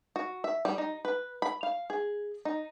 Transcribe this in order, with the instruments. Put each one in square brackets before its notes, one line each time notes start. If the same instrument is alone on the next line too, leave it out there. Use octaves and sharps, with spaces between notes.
[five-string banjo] F#4
E5
G3
D#4
B4
B5
F5
G#4
D#4